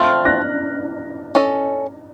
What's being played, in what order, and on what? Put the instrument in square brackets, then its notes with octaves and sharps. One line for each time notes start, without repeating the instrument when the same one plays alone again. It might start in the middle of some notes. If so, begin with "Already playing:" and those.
Already playing: [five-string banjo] F3 A3 C4 [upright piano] F6 A6
[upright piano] F#6 A#6
[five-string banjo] C#4 A4 D#5